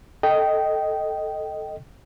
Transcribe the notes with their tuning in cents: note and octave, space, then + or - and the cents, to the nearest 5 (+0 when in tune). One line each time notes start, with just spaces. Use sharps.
A4 +0 D#5 +0 G5 -15